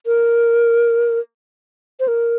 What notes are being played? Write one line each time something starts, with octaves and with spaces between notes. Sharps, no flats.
A#4
C5
A#4